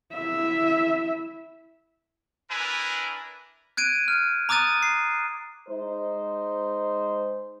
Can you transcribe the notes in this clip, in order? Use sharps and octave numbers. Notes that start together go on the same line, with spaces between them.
E4 E5
D4 E4 A#4 B4 G#5
F#6 G#6 D7 D#7
F6
A#5 D6 D#6 F#6 A6 D#7
C7
G#3 D#4 C5